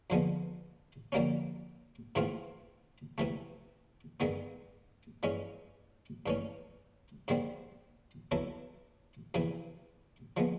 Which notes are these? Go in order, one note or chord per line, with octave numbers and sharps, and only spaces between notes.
F2 D3 F3 G#3 B3
F2 D3 G3 A#3 C#4
G#2 E3 A3 C4 F4
C3 E3 A3
G2 D#3 G#3 B3
G2 E3 G#3 C#4
G2 E3 A3 C#4
G#2 D#3 G3 C4
F#3 B3 E4 A4
E2 C3 E3
F3 G#3 B3